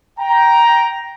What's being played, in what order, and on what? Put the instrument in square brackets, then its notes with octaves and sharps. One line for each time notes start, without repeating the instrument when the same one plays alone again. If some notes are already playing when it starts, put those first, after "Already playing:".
[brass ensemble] G5 A#5